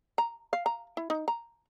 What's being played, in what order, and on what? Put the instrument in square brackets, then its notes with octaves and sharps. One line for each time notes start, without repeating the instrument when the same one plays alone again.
[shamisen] A#5
F5
A#5
E4
D#4
A#5